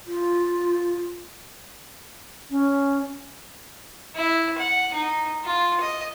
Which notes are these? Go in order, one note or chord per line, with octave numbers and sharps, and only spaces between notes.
F4
C#4
E4
F#5
D#4
F4
D#5